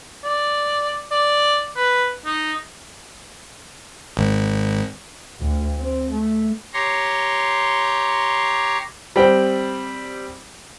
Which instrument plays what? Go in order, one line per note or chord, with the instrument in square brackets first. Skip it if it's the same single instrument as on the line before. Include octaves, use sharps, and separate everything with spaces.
[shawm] D5
D5
B4
D#4
[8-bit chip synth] G#1
[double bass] D2
C4
A3
[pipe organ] G4 C#5 A#5 C6
[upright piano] G3 C4 G5